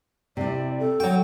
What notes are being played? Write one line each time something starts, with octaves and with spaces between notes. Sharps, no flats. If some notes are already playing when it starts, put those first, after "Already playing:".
C3 E4 D5
A4
F#3 F#4 G5